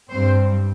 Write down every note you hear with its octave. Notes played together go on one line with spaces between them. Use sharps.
G2 G3 C4 C5